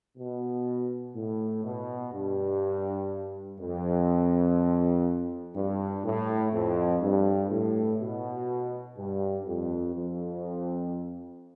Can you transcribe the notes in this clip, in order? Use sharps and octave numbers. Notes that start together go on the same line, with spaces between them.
B2
A2
B2
G2
F2
G2
A2
F2
G2
A2
B2
G2
F2
F2